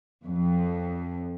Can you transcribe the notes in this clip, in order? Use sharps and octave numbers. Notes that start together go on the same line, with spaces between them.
F2